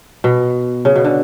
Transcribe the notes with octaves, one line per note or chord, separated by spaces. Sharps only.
B2
C#3
B2
D3